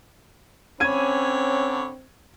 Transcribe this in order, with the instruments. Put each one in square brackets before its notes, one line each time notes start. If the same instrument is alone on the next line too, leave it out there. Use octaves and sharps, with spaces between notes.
[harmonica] D3 C#5 B5 [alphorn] C4 [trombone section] C#4 [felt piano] G#6 D#7